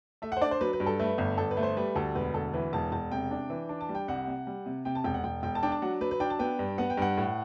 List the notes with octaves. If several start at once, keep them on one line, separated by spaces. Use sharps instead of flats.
A3 E5
F#5
C5
D4 D5
C5
F#3 B4
B4
G2
A4
A3 B4
G1
G1 A4
B4
A3
C5
G3 B4
D2 A4
E1 B4
D2 A4
E3 B4
E1 A5
E1 A5
C3 G5
D4
E3
D4
A5
G3
G5
C2 F#5
C3
G3
C3
C3 G5
A5
E1 G5
F#5
E1 G5
E1 G5
A5
D4 G5
A5
F#3 F#5
F#3 B4
B4
D4 G5
A5
B3 G5
G2
B3 F#5
G5
G2 F#5
A2